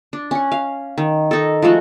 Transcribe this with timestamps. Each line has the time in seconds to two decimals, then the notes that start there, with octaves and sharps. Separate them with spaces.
0.13 D4
0.31 C#4 F#5
0.52 F5
0.98 D#3
1.31 D#4 A4
1.62 F3 G#3 A3 F#4